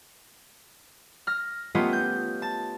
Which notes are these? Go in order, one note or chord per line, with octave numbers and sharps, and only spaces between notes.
F6 A#6
A3 B3 C#4 F4 G4 D#5
G6
A5